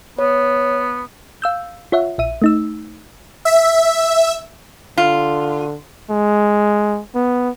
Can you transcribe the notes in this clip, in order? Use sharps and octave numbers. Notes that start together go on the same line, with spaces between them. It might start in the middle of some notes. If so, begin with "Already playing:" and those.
B3 C#5
F5 E6 G6
F4 C#5 E5 F#5
A#1 E5 D#7
A3 D#4 E6
E5
D3 F4
G#3
B3